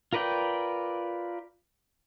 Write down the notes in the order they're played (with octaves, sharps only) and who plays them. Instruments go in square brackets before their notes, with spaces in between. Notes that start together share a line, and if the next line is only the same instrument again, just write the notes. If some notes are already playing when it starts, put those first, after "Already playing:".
[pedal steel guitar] F4 A#4 B4 D5 G5